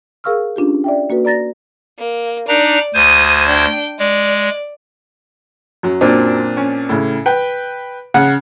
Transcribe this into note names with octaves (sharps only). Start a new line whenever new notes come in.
G#4 A#4 F5 C#6 E6 F6
C#4 D4 F4 G4
D5 E5 G5
A#3 F#4 A4 B4
D5 A#5 A6 A#6
A#3
D4 D#4 D5 A#5
D2 C5 D#6 G#6 D#7
D4 G5
G#3 D5
F#2 F#3
A#2 C4 D4
C#4
A2 C#3
B4 G5
C#3 F#5